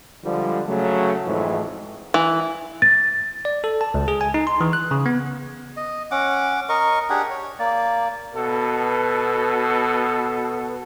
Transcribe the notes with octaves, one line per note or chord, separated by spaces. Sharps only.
D3 F3 G3 G#3
C#3 F#3 A3
F2 G#2 E3 A3
E3
A6
D5
A4
A5
C#2
G#4
G#5
D#4
C6
E3
F#6
C#3
B3
D#5
C#4 F#5 D6
A#4 D#5 C#6
D4 G4 G#4 F#5
C#5
A#3 D5
B2 B3 A4